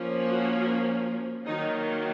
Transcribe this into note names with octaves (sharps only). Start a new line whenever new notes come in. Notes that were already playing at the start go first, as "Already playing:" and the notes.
Already playing: F3 A#3 C#4
F#4
D#3 F#3 A#3 D#4